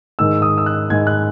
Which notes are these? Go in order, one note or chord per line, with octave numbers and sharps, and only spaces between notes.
G#2 D#3 G#3 E6
D#6
E6
F#6
G#2 D#3 G#3 G#6
F#6